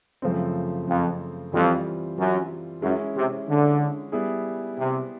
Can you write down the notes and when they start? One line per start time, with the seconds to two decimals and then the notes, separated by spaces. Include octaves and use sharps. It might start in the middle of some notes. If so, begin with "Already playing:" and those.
0.22 F#2 C#3 F3 A3 C4
0.87 F2
1.52 F2 E3 G3 C4 F4
2.18 F#2
2.82 F#2 G#3 C#4 E4
3.15 C3
3.48 D3
4.12 G3 B3 E4 G#4
4.77 C3